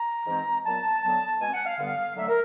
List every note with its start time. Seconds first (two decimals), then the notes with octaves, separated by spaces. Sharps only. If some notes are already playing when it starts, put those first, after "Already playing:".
Already playing: A#5
0.27 G#2 E3 G#3 C4
0.65 A#2 F#3 B3 A5
1.03 D3 F#3 B3
1.41 B2 G#3 C4 G#5
1.52 F#5
1.65 F5
1.78 G2 D3 G3 B3 F5
2.16 D3 F#3 A3 E5
2.28 A#4